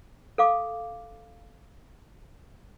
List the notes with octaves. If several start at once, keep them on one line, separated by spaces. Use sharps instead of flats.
A4 F5 D6